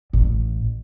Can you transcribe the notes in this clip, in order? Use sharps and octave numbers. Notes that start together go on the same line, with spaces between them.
A1